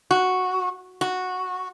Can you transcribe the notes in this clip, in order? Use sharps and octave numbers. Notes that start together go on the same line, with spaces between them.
F#4
F#4